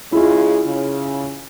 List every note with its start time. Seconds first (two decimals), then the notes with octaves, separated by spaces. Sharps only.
0.12 C#3 G#3 E4 F4 G#4
0.66 C#3